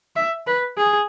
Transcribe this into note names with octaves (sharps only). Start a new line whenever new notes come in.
E5
B4
G#4